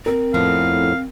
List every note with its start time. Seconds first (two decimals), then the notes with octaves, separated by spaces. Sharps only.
0.06 C4 A#4
0.34 F2 A2 B3 F5